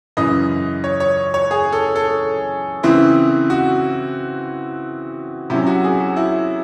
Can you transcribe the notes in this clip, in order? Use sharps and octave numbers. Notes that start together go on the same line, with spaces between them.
F#2 C#3 E3 D#5
C#5
C#5
C#5
G#4
A4
A4
C#3 E3 C4 E4
F#4
C3 F#3 C#4 E4
F#4
G#4
F#4
E4